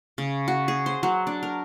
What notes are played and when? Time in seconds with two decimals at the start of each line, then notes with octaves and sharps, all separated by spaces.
0.18 C#3
0.48 F#4
0.68 G#4
0.86 C5
1.03 F#3
1.27 D4
1.43 A#4